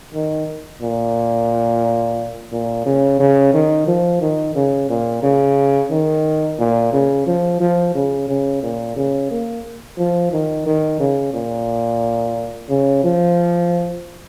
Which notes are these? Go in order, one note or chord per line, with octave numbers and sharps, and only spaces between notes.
D#3
A#2
A#2
C#3
C#3
D#3
F3
D#3
C#3
A#2
C#3
D#3
A#2
C#3
F3
F3
C#3
C#3
A#2
C#3
A#3
F3
D#3
D#3
C#3
A#2
C#3
F3